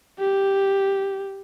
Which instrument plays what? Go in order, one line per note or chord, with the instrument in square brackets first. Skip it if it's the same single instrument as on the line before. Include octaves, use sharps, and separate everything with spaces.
[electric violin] G4